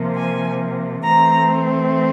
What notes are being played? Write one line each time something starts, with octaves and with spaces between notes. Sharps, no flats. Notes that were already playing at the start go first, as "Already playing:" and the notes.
Already playing: C3 F3 A#3
G#5
E3 A3 C4 A#5